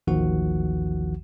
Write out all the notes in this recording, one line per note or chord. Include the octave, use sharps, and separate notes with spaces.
A1 D#2 D#3 F3 F#4 F#5